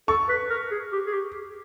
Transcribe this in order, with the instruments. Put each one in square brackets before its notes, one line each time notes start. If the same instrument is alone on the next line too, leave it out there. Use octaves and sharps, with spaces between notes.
[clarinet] A4 [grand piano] C#6
[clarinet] B4
A#4
G#4
G4
G#4
G4